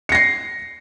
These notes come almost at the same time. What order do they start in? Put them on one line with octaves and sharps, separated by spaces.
C#7 A#6 C7